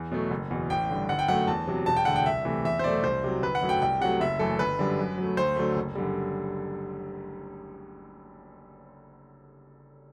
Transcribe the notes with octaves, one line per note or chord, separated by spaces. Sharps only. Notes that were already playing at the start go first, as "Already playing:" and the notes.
Already playing: E2
B2 F#3 A3
F#1
E2 B2
A1 G5
G2 D3
G1 F#5
G5
F#2 F#3 A3 F#5
E2 A5
C3 F#3
E1 A5
G5
D2 D3 F#5
G5
C2 E5
C3 E3 A3
E2 E5
C5
B2 F#3 A3 D5
C2 C5
C3 F#3
G1 B4
F#5
F#2 F#3 A3
G5
C2 G5
C3 F#3 A3 F#5
F#1 E5
F#2 E3 A3 A4
G1 B4
F#2 D3 G3
F#2
F#3 A3
D2 C5
D3 F#3 A3
F#1
F#2 D3 G3